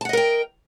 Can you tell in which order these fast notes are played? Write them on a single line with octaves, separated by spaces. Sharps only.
A5 F#5 D#5 A#4 G5